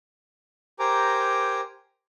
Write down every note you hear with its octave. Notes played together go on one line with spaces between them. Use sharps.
G4 A#4 C5 G#5 A#5 D6